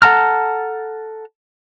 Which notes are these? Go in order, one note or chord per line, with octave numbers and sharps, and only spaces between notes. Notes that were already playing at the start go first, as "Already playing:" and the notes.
A4 F#5 A5 A#5 F6